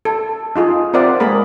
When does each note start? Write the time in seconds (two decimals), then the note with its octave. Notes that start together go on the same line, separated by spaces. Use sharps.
0.05 A4
0.56 D#4 F4 G#4
0.94 C4 A#4 C5 D5 E5 F#5
1.20 G#3 A#3 G#4 A#4 B5